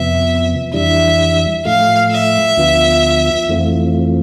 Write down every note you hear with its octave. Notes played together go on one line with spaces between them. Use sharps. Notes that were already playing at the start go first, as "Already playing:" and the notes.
Already playing: F2 C3 F3 B3 E5
F2 E3 G3 D4 E5
A2 F3 A3 F5
E5
D2 D3 F3 B3 F4
F2 E3 A3 C4 F4